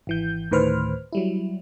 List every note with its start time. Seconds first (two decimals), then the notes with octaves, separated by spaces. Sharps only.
0.07 G#1 E3 G6
0.51 D2 A2 D#3 B4 C5 F6
1.12 F#3 G3 E4